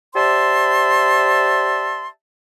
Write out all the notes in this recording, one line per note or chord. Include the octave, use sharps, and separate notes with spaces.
G4 C5 D5 E5 A5 C6